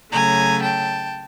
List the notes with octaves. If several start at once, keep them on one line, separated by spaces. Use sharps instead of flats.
C#3 F#3 A3 G#5 A#5
G5 A5